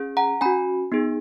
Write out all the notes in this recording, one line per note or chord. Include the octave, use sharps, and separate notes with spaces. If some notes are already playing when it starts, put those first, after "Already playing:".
Already playing: C#4 G#4
F#5 A#5
C#4 F#4 G#5 B5
B3 D#4 G#4